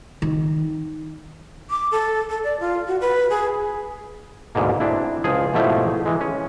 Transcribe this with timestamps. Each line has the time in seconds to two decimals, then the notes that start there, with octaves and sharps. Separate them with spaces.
0.22 D#3
1.70 D6
1.92 A4
2.30 A4
2.44 D5
2.60 F4
2.87 F#4
3.01 B4
3.30 G#4
4.55 D2 G#2 B2 A#3
4.80 C4 D4 E4
5.24 C#2 F3 G#4 G#5
5.54 G#2 B2 F3 A3 E4 G4
6.06 E3 G#3
6.21 C#4